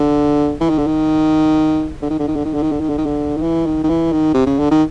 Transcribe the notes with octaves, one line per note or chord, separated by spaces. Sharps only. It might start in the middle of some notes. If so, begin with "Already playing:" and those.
Already playing: D3
E3
D#3
D3
D#3
D3
D#3
D3
D#3
D3
D#3
D3
D#3
D3
D#3
D3
D#3
D3
D#3
E3
D#3
D#3
E3
D#3
C3
C#3
D3
D#3